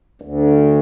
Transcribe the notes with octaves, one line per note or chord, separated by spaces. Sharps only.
D2